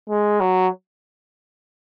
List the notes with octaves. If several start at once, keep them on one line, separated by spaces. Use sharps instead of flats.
G#3
F#3